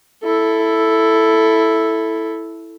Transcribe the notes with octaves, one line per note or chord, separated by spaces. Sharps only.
E4 A4